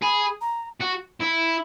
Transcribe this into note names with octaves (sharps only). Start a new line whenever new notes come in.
G#4 B5
A#5
F#4
E4